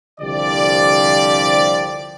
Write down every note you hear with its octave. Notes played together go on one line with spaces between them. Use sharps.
C2 D3 F3 G4 D5